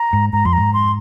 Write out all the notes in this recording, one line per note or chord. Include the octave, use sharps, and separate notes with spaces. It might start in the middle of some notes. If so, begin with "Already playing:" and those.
Already playing: A#5
G#2
G#2 A#5
F2 C6
G#2 A#5
C6